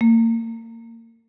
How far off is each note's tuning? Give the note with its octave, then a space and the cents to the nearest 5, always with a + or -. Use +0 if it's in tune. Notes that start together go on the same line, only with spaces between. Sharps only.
A#3 -35